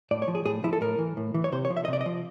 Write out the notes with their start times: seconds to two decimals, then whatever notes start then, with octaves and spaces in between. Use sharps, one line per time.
0.11 A2 D5
0.22 C#5
0.28 F3
0.35 G#4
0.45 A2 G#4
0.64 F3 E4
0.73 A4
0.81 A2 A#4
0.99 E3
1.17 A2
1.34 E3
1.44 C#5
1.52 C3 C5
1.65 C#5
1.70 F3
1.77 E5
1.85 D#5
1.88 C3
1.93 D5
2.01 D#5
2.06 F3